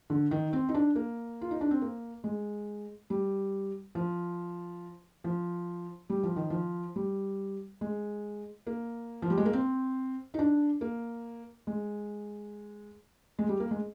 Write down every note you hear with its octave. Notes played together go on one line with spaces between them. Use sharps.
D3
D#3
C4
D#4
D4
A#3
F4
D#4
D4
C4
A#3
G#3
G3
F3
F3
G3
F3
D#3
F3
G3
G#3
A#3
F3
G3
G#3
A#3
C4
D#4
D4
A#3
G#3
G#3
G3
A#3
G#3